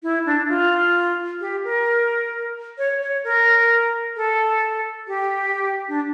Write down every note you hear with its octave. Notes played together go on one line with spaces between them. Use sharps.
E4
D4
F4
G4
A#4
C#5
C#5
A#4
A4
G4
D4